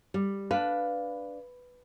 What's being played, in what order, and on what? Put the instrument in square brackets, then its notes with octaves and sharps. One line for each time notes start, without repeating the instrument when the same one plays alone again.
[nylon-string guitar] G3
[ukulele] D4 F5 [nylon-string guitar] B4